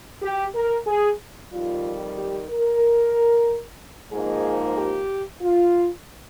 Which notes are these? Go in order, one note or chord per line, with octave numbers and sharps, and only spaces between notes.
G4
A#4
G#4
F2 D#3 G3 F4
G4
A#4
G#2 F3 A#3 D#4 G#4
G4
F4